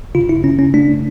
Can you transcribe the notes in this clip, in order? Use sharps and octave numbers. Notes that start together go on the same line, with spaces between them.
C#3 F4
E4
C#3 C#4
C#4
A3 D4